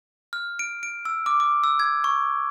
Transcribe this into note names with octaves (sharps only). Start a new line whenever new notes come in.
F6
D7
D7
E6
D6
D6
E6
G#6
C#6